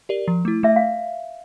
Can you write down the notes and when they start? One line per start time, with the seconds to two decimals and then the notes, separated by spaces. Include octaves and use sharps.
0.09 G4 A#4 D5
0.28 F3
0.45 A3 E4
0.63 A3 E5
0.76 F5